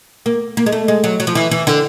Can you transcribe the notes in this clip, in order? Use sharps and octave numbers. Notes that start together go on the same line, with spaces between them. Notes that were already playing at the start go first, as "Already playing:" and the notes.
A#3
A#3
G#3
A3
G#3
F#3
F#3
F3
E3
E3
D3